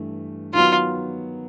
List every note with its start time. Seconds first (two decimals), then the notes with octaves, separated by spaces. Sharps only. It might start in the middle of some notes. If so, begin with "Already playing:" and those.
Already playing: G2 E3 A3
0.54 D#3 F#3 B3 F4